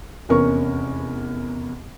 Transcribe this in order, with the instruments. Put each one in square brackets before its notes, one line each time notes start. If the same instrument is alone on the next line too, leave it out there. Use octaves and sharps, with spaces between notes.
[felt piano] F1 E2 C#4 A#4 C#6